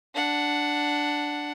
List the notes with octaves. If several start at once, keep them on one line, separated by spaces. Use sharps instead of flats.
D4 F#5